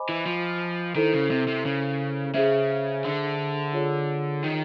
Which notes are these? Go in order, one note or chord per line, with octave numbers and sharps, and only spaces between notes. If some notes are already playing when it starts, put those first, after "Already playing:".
Already playing: C5 D#5 G#5 B5 D6
E3
F3
D#3 E4 A4 C5
C#3
C3
C3
C#3
C#3 G#4 C5 E5
D3
F4 G#4 C#5
D#3